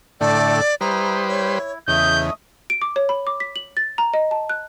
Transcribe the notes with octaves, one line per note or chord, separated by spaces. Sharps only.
A2 D3 A3 A4 D5 G5
G3 E4 B4 C5 A#5 D#6
E4 C#5
E2 C#3 A3 D#5 E5 D#6 G6
D7
D6
C#5
B5
D6
B6
F#7
A6
A#5
D#5
A5
F#6